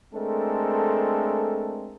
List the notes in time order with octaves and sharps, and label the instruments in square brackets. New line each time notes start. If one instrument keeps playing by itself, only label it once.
[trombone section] G#3 A3 C4 D4 A4 A#4